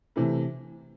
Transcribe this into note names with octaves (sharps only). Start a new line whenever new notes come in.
C3 E3 A3